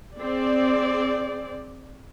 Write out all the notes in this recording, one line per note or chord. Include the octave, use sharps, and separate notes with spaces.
C4 G#4 D5